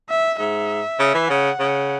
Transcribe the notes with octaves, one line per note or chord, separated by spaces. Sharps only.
E5
G#2 E5
C#3
E3
C#3 F#5
C#3